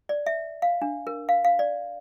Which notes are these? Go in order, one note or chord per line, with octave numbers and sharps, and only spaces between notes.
D5
E5
F5
D4
A#4
F5
F5
D5